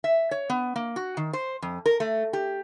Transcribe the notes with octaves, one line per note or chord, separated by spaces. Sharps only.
E5
C#5
B3
A#3
F#4
D#3
C5
F2
A#4
A3
G4